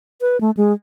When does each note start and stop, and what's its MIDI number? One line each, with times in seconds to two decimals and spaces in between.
0.21 0.40 71
0.41 0.51 57
0.57 0.73 56